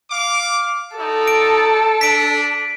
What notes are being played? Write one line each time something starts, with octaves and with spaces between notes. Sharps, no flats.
F5 D6
D#4 F#4 A4 D5
D7
D4 B6 D7